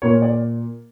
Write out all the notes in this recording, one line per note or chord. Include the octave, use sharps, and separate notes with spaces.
A#2 A#3 C#5
D5